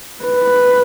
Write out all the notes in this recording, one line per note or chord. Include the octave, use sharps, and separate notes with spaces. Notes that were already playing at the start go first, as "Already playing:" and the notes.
B4